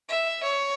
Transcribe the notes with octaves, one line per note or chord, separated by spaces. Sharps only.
E5
C#5